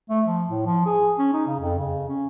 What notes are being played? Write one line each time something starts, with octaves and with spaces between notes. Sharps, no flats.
A3
F3
A2
F3
G#4
C#4
D#4
C#3
F2
C#3
C#4